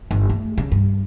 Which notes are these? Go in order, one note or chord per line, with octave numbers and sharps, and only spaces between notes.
G1
A3
C#3
G2